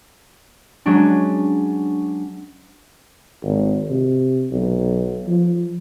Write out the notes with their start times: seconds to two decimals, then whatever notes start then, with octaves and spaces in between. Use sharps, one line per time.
0.86 F#3 G#3 C#4 D4
3.43 G#1
3.90 C3
4.51 B1
5.27 F3